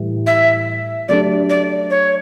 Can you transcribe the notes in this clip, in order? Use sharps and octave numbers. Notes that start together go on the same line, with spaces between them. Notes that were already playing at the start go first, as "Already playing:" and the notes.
Already playing: A2 E3 G3
E5
F#3 A3 D4 G4 D5
D5
C#5